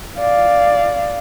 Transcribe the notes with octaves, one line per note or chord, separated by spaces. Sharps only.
D5 F5